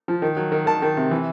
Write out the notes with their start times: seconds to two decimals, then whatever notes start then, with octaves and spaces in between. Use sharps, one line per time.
0.08 F3
0.22 D#3
0.37 F#3
0.52 D#3
0.66 D#3 A5
0.82 D#3
0.97 C3
1.11 E3